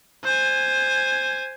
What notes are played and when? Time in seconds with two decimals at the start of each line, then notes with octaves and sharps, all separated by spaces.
0.24 C5 G#5